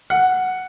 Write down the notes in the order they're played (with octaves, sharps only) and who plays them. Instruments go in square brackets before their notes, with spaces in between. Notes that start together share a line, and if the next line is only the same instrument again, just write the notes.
[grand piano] F#5